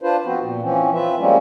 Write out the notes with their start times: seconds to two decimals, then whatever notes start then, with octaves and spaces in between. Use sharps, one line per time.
0.02 D4 F4 B4 C5
0.25 F3 B3 C4 F#4
0.41 A#2
0.62 E3 F3 C4 C#4
0.93 C4 F4 B4 E5
1.19 F3 G3 G#3 A#3 C4 C#4